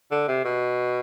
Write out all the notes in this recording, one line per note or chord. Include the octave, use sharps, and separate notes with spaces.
D3
C3
B2